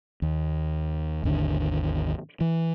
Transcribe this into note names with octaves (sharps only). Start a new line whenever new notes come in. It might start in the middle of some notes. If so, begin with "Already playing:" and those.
D#2
G#1 D#2 D3
E3